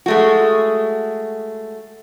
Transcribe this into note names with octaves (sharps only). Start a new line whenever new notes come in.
G#3 A3 F#4